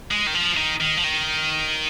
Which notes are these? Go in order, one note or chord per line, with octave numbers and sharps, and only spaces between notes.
G#3
D#3
F3
D#3
D#3
F3
D#3